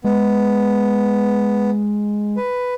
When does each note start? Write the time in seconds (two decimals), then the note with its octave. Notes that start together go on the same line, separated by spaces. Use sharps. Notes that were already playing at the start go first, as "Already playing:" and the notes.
0.04 G#3 B3
2.37 B4